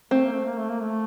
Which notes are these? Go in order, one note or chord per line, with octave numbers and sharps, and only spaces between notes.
A3 C4
A#3
A3
A#3
A3
A#3
A3